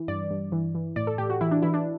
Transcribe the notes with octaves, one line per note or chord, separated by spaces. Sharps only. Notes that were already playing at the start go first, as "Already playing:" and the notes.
Already playing: E3
G2 D5
G2
E3
E3
A2 D5
A4
A2 G4
F#4
E3 E4
D4
E3 E4
D4